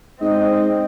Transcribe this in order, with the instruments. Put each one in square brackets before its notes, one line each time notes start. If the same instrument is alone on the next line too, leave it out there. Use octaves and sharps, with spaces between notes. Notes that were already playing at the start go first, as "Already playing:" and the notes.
[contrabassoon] G#2 [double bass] C4 [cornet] D#5